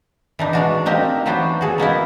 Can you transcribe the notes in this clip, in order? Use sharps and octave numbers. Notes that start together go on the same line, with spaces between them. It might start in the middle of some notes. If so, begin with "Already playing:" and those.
E3 D4 D#4
G#3 D4 F#4
A#3 C4 D#4 G4
E3 F#3 B3 D4 F#4 C5
F#4 G#4 A4
A#3 B3 D#4 E4